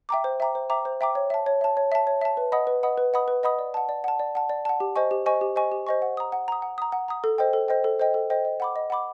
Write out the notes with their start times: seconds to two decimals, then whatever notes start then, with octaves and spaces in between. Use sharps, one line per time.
0.09 E5 G5 A#5 D6
0.24 C5
0.40 E5 G5 A#5 D6
0.55 C5
0.70 E5 G5 A#5 D6
0.85 C5
1.01 E5 G5 A#5 D6
1.15 C#5
1.30 E5 A5
1.46 C#5
1.61 E5 A5
1.77 C#5
1.92 E5 A5
2.07 C#5
2.21 E5 A5
2.37 B4
2.52 D#5 F#5 B5 D#6
2.67 B4
2.83 D#5 F#5 B5 D#6
2.97 B4
3.13 D#5 F#5 B5 D#6
3.28 B4
3.43 D#5 F#5 B5 D#6
3.59 D5
3.74 F#5 A5
3.89 D5
4.04 F#5 A5
4.19 D5
4.35 F#5 A5
4.50 D5
4.65 F#5 A5
4.80 G4
4.96 C5 D#5 G#5 C#6
5.11 G4
5.26 C5 D#5 G#5 C#6
5.41 G4
5.56 C5 D#5 G#5 C#6
5.72 G4
5.87 C5 D#5 G#5 C#6
6.02 F#5
6.17 A#5 D#6
6.32 F#5
6.48 A#5 D#6
6.62 F#5
6.78 A#5 D#6
6.92 F#5
7.08 A#5 D#6
7.24 A4
7.38 C5 D#5 G5
7.53 A4
7.68 C5 D#5 G5
7.84 A4
7.99 C5 D#5 G5
8.14 A4
8.30 C5 D#5 G5
8.45 D#5
8.60 F#5 B5 D6
8.76 D#5
8.90 F#5 B5 D6